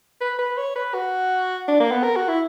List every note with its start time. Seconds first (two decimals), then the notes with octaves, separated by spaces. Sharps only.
0.21 B4
0.39 B4
0.57 C#5
0.76 B4
0.94 F#4
1.68 D4
1.80 A#3
1.91 B3
2.04 A#4
2.16 F#4
2.29 E4